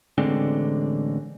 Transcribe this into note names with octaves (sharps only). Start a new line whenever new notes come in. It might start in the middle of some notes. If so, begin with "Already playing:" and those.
A1 D3 G#3 C4